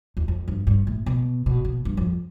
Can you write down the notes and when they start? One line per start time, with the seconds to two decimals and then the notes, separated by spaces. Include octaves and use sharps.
0.17 E2
0.28 F2
0.48 G2
0.67 G2
0.87 A2
1.06 B2
1.46 B2
1.65 B2
1.85 G2
1.97 F2